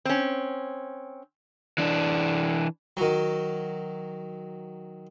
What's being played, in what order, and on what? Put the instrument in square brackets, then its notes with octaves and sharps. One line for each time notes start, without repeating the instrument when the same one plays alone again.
[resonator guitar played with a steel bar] C4 C#4
[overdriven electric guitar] E3 D4
[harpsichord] D#3 F#3